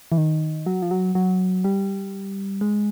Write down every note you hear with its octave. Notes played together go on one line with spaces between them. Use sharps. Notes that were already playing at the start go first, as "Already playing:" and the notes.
E3
D#3
F#3
F3
F#3
F#3
G3
G#3